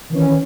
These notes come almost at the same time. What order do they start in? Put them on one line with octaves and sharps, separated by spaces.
D#3 E3 C#4